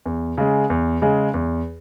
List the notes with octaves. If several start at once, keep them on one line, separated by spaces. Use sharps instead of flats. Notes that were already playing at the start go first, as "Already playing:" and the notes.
E2
C#3 G#3
E2
C#3 G#3
E2